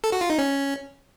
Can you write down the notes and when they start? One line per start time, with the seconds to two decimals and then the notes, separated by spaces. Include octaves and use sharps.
0.04 A4
0.12 F#4
0.21 F4
0.30 D#4
0.38 C#4